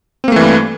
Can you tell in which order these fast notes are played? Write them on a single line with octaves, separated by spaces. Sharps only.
C4 A#3 A3 E3 G2